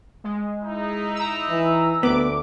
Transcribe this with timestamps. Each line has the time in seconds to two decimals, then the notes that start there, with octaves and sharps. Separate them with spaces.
0.24 G#3
0.63 D#4 E4
1.15 A#5 E6
1.49 E3
2.03 D2 B3 D6